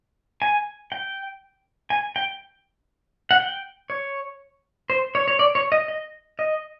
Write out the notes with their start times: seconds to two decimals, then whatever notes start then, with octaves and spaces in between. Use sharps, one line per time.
0.42 G#5
0.92 G5
1.90 G#5
2.16 G5
3.31 F#5
3.40 G5
3.90 C#5
4.90 C5
5.15 C#5
5.28 C#5
5.39 D5
5.55 C#5
5.72 D#5
5.88 D#5
6.39 D#5